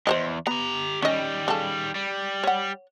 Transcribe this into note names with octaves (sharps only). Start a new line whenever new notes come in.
E2 G2 C5 C#5 D#5
B3 G4 A#5
D#3 G3 C#4 D#5
C#3 A4
G3
C#5 F#5